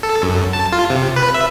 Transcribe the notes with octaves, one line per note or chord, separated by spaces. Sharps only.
A4
F#2
A5
F4
C3
B4
E5